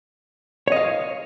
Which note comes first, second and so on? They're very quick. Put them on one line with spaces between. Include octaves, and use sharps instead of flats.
C#5 D#5 F5